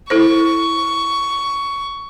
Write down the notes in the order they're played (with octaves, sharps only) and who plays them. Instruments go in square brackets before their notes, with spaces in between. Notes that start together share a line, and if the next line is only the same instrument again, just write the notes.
[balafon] E4 A4 C5 [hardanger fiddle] C#6